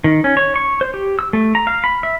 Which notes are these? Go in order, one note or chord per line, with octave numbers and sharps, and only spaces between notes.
D#3
C#4
C#5
C#6
C5
G4
E6
A3
A#5
F5
B5
E5